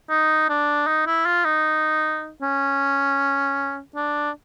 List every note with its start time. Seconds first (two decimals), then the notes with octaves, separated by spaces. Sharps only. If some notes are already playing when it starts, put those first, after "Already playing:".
0.10 D#4
0.49 D4
0.87 D#4
1.07 E4
1.26 F4
1.45 D#4
2.42 C#4
3.96 D4